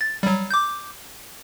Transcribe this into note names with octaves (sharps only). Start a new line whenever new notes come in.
A6
F#3 G3
D6 G6